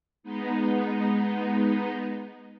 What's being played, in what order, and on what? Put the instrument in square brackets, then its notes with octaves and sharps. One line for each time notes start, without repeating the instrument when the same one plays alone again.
[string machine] G#3 B3 D#4